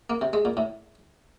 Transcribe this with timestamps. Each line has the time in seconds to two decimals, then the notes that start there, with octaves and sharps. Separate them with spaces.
0.10 A#3
0.21 C3
0.33 G#3
0.45 A#2
0.57 A2